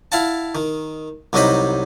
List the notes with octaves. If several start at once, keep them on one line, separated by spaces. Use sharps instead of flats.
E4 F5 F#5 A5
D#3
C2 F#3 G3 D#4 D#5 B5